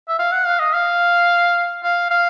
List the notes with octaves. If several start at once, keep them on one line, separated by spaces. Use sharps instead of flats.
E5
F5
F#5
F5
D#5
F5
F5
F5